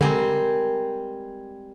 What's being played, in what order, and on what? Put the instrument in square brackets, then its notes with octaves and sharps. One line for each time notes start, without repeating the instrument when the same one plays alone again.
[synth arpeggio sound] D3 [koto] G3 C4 [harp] G#3 A#4 G#5